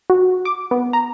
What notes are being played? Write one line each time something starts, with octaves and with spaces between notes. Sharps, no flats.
F#4
D6
B3
A#5